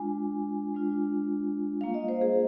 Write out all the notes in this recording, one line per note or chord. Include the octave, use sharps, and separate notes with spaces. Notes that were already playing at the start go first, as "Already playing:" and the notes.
Already playing: G#3 D4 F4 G#5
G#3 D4 F4
G3 A#3 F4 F5
D#5
C5
G#4